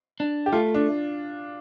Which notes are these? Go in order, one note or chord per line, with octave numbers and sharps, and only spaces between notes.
D4
G4
A3 F4
D4